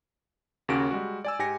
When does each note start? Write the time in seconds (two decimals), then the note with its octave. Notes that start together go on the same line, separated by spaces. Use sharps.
0.68 D#2 C#3 A#3 C#4 F#4 D7
0.91 G3 G#3 F#4
1.25 D5 G#5 E6
1.39 G#2 G4 G#5 A#6 C#7